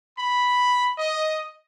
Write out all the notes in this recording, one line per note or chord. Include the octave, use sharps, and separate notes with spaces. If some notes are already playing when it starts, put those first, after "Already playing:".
B5
D#5